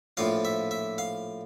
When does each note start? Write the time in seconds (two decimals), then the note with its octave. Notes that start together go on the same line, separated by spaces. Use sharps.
0.17 A#1 A2 F3 F5
0.45 E5
0.71 E5
0.98 F5